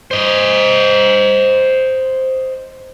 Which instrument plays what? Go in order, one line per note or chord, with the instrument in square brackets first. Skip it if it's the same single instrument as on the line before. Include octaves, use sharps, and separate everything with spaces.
[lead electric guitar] C5 D#5